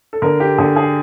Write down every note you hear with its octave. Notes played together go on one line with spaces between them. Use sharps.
A4
D3 A#4
G4
D3 G#4
G#4